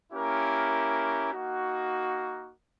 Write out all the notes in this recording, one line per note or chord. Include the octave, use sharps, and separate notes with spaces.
A#3 C#4 E4 G4 A#4
A#3 D#4 F#4